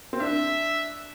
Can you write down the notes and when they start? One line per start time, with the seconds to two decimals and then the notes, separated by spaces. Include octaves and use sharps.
0.13 C4
0.20 D4 E5